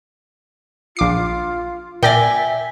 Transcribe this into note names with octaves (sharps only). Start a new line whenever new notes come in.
A#1 F4 D6 C7
A#2 D5 E5 G5 G#5 A#6